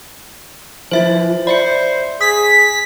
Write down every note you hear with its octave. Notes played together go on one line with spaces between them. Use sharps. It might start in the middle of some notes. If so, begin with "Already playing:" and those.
F3 E4 B4 C5 E5 A6
C5 D5 E5 B5 C#7
G#4 D#6 B6